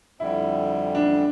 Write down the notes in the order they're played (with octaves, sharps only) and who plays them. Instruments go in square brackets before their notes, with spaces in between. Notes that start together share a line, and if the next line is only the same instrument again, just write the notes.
[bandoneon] F2 D3 G3 [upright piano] E4
[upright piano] D4